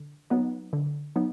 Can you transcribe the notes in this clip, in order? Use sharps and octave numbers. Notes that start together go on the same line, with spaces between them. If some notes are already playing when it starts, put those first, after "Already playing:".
Already playing: D3
F#3 B3 D#4
D3
F#3 B3 D#4